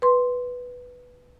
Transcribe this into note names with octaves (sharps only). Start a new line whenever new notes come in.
B4 C6